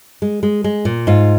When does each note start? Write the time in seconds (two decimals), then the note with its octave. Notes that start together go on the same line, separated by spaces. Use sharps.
0.22 G#3
0.43 G#3
0.64 G#3
0.85 A#2
1.07 G#2 F4